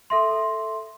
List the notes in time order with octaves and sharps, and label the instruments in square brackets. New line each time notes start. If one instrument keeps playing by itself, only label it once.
[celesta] A4 E5 C6